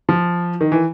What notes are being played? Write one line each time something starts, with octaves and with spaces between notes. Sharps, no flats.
F3
D#3
E3